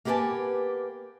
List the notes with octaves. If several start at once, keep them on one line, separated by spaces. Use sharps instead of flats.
A#3 B3 G4 B4 G#5 A5